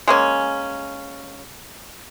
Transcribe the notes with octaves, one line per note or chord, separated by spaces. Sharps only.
G#3 A#3 C#4